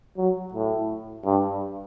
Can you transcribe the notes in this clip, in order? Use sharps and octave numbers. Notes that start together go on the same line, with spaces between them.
F#3
A2
G2